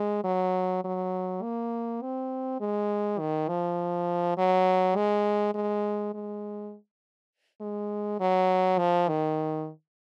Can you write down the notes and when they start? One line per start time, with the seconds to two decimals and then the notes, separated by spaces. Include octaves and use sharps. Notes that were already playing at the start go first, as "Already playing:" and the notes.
Already playing: G#3
0.24 F#3
0.84 F#3
1.42 A#3
2.02 C4
2.61 G#3
3.19 D#3
3.48 F3
4.38 F#3
4.96 G#3
5.55 G#3
6.14 G#3
7.61 G#3
8.20 F#3
8.79 F3
9.09 D#3